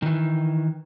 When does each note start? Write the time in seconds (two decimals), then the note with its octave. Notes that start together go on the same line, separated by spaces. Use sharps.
0.02 D#3 E3